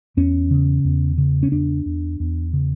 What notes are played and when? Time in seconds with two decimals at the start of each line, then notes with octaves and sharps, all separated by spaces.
0.17 E2 C#4
0.51 C#3
0.85 E2
1.18 C#3
1.43 C#4
1.52 E2 D4
1.86 E2
2.20 E2
2.53 C#3